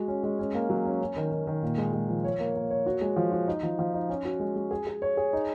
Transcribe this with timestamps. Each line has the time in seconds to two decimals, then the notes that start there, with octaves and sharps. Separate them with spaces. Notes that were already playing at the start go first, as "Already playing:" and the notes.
Already playing: G#3 F#4
0.08 C#4
0.23 G#3
0.39 C#4
0.54 A#3
0.70 F#3
0.85 C#4
1.01 C#4
1.16 D#3
1.32 D#3
1.47 D#3
1.63 A#2
1.78 G#3
1.93 G#3
2.09 F3
2.24 C#5
2.40 A#3
2.55 A#3
2.71 C#5
2.86 F#4
3.01 G#3
3.17 F3
3.32 F#4
3.48 D#4
3.63 F3
3.79 F3
3.94 D#4
4.09 C#4
4.25 F#4
4.40 G#3
4.56 G#3
4.71 G#4
4.87 G#4
5.02 C#5
5.17 G#4
5.33 D#4